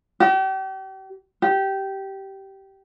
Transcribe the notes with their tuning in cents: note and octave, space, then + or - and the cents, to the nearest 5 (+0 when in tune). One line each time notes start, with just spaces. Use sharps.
G4 -40
G4 -15